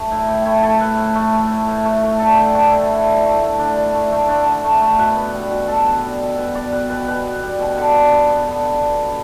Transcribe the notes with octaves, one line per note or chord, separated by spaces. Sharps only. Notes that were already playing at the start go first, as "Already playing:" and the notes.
Already playing: A3
A2 E4
A2 G4
A3 E4
A3 A4
A2 B4
A2
A3
A3
A2
A2
A3
A3
D3 A4
D3 G4
A3 D4
A3 E4
D3 E4
D3
A3
A3
D3 D4
D3
A3
A3
D3 D4
D3
A3
A3
B2 B4
B3
G3
B2
B2 A4
B3
G3
B2
B2 B4
B3 D5
G3 B4
B2 B4
B2 B4
B3
G3
B2
D3 B4
D3
B3
B3
D3
D3
B3
B3